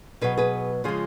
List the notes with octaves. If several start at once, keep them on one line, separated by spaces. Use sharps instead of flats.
B2 F#3 G#4 B4
G#4 B4
C#3 F3 G#3 F4 G#4